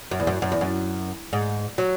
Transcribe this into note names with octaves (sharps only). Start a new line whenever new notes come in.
F#2
E2
F#2
F#2
E2
F#2
G#2
F#3